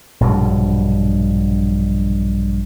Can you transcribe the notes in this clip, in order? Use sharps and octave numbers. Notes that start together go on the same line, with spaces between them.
A#1 G2 B2 F#3